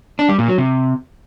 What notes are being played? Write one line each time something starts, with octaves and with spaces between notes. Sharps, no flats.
D4
G3
A#2
F#3
C3